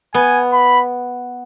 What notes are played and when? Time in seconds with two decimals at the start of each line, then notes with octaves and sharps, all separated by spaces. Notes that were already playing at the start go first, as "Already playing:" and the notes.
0.14 B3 G#5
0.53 B5